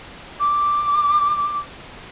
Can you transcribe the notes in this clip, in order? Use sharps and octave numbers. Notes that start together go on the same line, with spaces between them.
D6